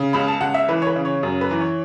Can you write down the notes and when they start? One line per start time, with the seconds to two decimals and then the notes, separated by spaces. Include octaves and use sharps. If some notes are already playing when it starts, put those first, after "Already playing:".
Already playing: C#3
0.13 C#2 B5
0.28 A5
0.41 C#2 F#5
0.54 E5
0.68 E3 B4
0.82 C#5
0.87 B4
0.96 C#3
1.05 C#5
1.23 F#2
1.41 B4
1.51 E3
1.61 C#5